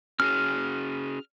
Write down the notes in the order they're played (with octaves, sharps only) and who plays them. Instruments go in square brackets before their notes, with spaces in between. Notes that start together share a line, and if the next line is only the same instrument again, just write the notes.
[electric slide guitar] C#4 F#4 G#4 [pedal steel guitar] F6